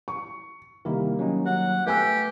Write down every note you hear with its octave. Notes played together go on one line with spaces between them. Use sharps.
C#6
C3 D#3 G3 A#3 E4 A#4
F#3 C#4 D#4
F#3 F#5
A3 B3 G4 G#5 E6